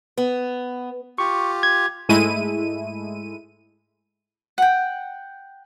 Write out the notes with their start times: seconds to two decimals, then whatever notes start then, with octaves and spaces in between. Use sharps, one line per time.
0.17 B3
1.18 F4 G4 C#6
1.63 G#6
2.09 G#2 G#3 A3 E4 D#7
4.58 F#5 G5